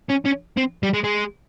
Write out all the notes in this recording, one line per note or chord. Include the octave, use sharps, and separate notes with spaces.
C#4
C#4
C4
G3
G#3
G#3